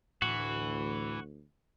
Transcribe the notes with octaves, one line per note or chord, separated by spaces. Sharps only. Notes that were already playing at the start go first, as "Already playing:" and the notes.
D2 A2 E3 F#4